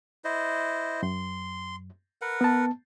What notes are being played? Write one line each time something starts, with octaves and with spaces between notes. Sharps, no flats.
E4 C5 D#5
F#2 C6
A#4 B4 F#5
B3 A5